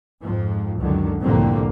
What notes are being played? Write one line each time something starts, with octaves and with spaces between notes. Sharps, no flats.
F2 G#2 F3
C#2 F#2 D3 D#3
C2 F2 A2 D3 A#3 C4